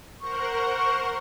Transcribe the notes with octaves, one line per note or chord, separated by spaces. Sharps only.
A#4 C5 F#5 C#6